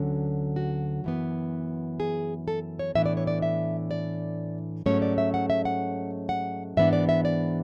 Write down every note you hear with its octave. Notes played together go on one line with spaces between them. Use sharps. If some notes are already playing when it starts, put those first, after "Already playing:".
Already playing: D2 D3 F#3 C#4
F#4
F#2 E3 B3
G#4
A4
C#5
A2 E3 B3 D4 E5
D5
C#5
D5
E5
D5
G#2 F#3 A3 C#4 C#5
D5
E5
F#5
E5
F#5
F#5
G#2 E3 B3 D4 E5
D5
E5
D5